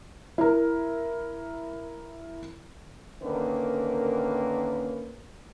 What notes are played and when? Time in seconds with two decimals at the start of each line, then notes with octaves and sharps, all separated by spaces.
0.38 E4 A#4
3.23 D3 D#3 A#3 C#4 A#4 B4